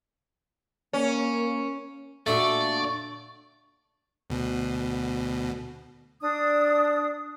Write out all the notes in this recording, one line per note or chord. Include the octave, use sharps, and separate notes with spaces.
A#3 C#4
A#2 A3 D4 F#4 D5 C#6
D2 B2
D4 D#6